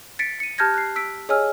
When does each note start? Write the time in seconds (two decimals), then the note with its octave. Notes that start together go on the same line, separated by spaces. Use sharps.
0.19 A6 B6 C#7 D7
0.40 C#7 D#7
0.58 G4 A5 F6 G6 G#6 A#6
0.74 F#6 G#6 C7
0.96 E6 B6 D7
1.29 G#4 C#5 D#5 G#5 E6 F6